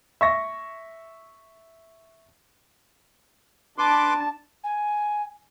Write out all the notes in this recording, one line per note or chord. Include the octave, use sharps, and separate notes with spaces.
E5 C#6 A#6
D4 B4 A5 C6 D6
G#5